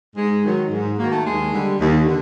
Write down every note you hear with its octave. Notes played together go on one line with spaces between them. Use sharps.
G#2 G#3
D#3 F#3
G#2
D#3 F#3 A#3
A3
D#2 G#3
D3 G3
D#2
D3